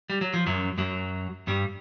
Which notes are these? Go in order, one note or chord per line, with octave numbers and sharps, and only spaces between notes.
G3
F#3
F3
F#2 F#3
F#2 F#3
G2 G3